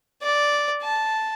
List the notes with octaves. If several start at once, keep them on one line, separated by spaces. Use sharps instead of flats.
D5
A5